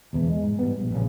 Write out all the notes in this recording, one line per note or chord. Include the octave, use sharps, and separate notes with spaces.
E1 E2 E3
G#3
G#2
G3 B3
A#1
A#1 G2 C#3